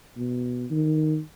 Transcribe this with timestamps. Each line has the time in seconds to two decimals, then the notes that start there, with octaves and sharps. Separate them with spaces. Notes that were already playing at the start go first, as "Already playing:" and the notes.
0.17 B2
0.71 D#3